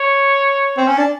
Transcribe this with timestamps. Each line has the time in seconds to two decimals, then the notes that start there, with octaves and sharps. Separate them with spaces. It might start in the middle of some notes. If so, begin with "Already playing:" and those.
Already playing: C#5
0.78 C4
0.88 C#4
0.98 D4